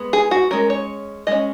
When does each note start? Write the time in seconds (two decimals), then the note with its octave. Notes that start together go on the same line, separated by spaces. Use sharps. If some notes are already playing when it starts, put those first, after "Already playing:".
Already playing: G#3 B3
0.13 G#4
0.31 F#4
0.51 G#3 C#4 A#4
0.70 C#5
1.27 G#3 C#4 D#5